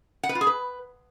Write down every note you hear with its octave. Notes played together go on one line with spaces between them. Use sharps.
F#5
B4
F4
G#4
B4